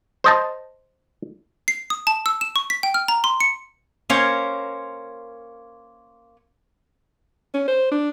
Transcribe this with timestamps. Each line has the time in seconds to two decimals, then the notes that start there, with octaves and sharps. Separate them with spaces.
0.24 C5 D#5 A5
1.68 C7
1.90 D#6
2.07 A5
2.26 E6
2.41 E7
2.56 C#6
2.70 B6
2.83 G5
2.94 F6
3.08 A#5
3.24 C6
3.40 C#7
4.09 A#3 C#4 A#4 C5 C#5 F5
7.54 C#4
7.68 C5
7.92 D4